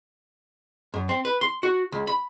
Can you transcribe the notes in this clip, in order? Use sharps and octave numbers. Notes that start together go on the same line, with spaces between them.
F#2
C4
B4
C6
F#4
C#2
B5